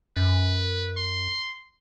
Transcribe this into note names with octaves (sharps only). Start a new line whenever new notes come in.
F#2 B4
C6